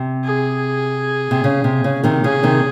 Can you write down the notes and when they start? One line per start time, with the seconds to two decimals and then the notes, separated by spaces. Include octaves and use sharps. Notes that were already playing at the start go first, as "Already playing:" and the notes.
Already playing: C3
0.24 G#4
1.31 C3
1.44 C#3
1.64 C3
1.84 C#3
2.03 C3 D#3
2.24 C#3 G#4
2.43 C3 D#3